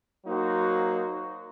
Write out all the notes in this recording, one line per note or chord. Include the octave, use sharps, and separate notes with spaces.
F#3 A#3 D#4 F#4 C5